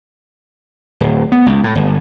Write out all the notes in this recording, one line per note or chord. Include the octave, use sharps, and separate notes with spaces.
D1
B3
C#2
A2
G1